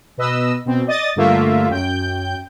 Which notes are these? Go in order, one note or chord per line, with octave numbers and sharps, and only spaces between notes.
B2 B4 D#5 E6
B2 C4
D5 D#5 D#6 A6
G2 D3 A3 A#3 F4 E5
F#2 G5 G6